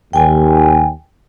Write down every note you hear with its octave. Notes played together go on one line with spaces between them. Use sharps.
D#2 G5 G#5